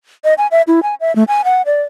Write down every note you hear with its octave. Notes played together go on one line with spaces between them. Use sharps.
D#5
G#5
E5
E4
G#5
E5
A3
G#5
F#5
D5